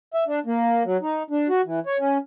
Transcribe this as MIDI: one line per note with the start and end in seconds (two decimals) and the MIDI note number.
0.14 0.24 76
0.27 0.39 62
0.46 0.83 58
0.84 0.97 54
1.01 1.23 63
1.30 1.48 62
1.49 1.61 66
1.65 1.80 52
1.86 1.98 73
2.00 2.18 61